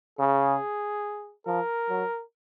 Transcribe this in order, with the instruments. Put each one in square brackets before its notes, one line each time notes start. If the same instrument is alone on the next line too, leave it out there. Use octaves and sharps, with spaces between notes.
[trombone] C#3 [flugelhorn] G#4
[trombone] F3 [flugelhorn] A#4
[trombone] F#3